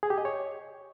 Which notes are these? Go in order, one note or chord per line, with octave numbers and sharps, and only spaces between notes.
G#4
G4
D#5
C#5